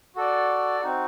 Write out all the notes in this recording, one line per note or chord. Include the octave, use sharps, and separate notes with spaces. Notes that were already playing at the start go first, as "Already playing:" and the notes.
F#4 A4 D5
C4 D#4 F#4